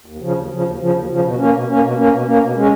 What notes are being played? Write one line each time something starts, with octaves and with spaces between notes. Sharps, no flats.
D#2
C#3 F3
D#2
C#3 F3
D#2
C#3 F3
D#2
C#3 F3
B2
A#3 C#4
B2
A#3 C#4
B2
A#3 C#4
B2
A#3 C#4
B2
G#3 C#4